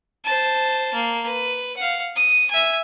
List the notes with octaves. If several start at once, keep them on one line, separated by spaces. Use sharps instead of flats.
C5 A5
A#3
B4
F5 F#5
D#6
E5 G#5